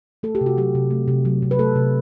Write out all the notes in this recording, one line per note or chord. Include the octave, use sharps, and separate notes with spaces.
A3 A4
G4
C3
F#4
F#3 G4
C3
A3
C3
F#3
C3
B4
A3 A4
C3